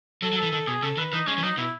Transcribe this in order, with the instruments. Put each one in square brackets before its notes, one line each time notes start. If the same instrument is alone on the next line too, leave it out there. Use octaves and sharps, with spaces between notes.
[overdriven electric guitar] F#3 [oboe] A4
[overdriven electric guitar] F#3
[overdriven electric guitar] E3 [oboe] A4
[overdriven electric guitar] D#3 [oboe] A4
[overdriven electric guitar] B2 [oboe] G#4
[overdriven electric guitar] C#3 [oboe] A4
[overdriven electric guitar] D#3 [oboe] B4
[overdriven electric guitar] E3 [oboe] D#4
[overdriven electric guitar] G#3 [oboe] C#4
[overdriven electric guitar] E3
[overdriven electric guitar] F#3 [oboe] D#4
[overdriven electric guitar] B2 [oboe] E4